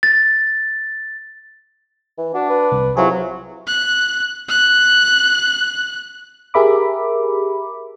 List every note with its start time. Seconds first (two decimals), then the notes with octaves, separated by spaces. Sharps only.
0.03 A6
2.18 E3
2.34 D4 F#4
2.49 B4
2.72 C2
2.97 C3 F#3 E4 F4 G#4
3.67 F#6
4.48 F#6
6.54 G4 G#4 A#4 E5 B5 D6